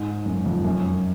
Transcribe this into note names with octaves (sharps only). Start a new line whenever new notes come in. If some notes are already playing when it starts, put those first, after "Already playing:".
Already playing: G#2
F#2
F2
F#2